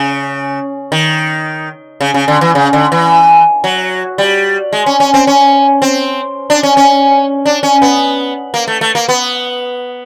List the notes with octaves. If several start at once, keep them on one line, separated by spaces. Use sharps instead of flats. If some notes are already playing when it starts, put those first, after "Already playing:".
Already playing: C#3
D#3
C#3
C#3
D3
E3
C#3
D3
E3
F#3
G3
G#3
C#4
C#4
C4
C#4
C4
D4
C#4
C#4
D4
C#4
B3
A#3
A3
A3
A#3
B3